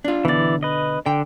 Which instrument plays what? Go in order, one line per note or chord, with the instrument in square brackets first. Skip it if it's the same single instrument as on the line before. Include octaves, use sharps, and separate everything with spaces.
[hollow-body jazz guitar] D4 F4
[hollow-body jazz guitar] B2 D3 [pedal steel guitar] E3 D5
[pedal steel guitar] B4 D#5
[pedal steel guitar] D3 [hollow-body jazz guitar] G5